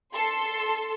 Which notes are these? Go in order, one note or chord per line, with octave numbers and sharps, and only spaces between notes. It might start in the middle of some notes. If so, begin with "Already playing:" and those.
A4 C6